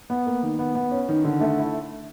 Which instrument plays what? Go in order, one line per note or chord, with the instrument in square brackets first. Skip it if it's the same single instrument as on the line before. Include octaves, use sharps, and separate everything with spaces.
[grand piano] B3
A#3
D#3
B3
B3
C#4
D#3
D3
A3
E4